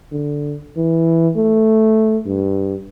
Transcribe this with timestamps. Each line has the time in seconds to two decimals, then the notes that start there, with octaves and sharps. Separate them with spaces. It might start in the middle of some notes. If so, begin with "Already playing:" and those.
0.12 D3
0.77 E3
1.36 A3
2.26 G2